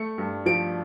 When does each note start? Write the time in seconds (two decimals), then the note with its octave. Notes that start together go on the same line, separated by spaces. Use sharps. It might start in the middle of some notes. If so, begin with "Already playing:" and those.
Already playing: A3 C#7
0.18 G2
0.46 F3 D7